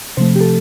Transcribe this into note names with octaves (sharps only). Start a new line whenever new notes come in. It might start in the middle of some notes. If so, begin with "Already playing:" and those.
C3 F3 A3 C5
G4
A4